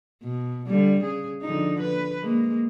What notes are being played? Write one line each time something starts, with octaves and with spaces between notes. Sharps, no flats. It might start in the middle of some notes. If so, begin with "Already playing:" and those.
B2
D3 G3
C#3 G#4
D3 F3 D#4
B4
G#3 A#3